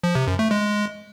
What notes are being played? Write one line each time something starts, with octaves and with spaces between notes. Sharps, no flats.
F3
C3
F#2
A3
G#3